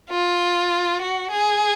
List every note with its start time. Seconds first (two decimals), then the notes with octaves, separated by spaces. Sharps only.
0.10 F4
1.01 F#4
1.30 G#4